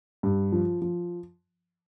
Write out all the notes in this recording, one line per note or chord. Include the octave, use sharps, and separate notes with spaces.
G2
F3
F3